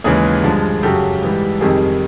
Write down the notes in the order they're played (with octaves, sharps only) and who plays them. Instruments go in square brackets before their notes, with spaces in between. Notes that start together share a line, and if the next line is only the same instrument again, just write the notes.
[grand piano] D#2 C#3 E3 G#3 G#4
G2 D3 F3 G#3
F#2 C#3 F#3 G4 A4
G#2 E3 G3
F2 C3 D#3 G3 G#4